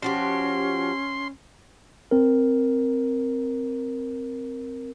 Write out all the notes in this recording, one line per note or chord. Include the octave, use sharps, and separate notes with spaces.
F3 C#4 F#4 G4 C6
C4 A#4